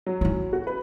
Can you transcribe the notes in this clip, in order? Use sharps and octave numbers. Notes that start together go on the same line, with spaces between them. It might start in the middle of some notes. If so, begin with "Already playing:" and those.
F#3
C#4 E4
F#4
B4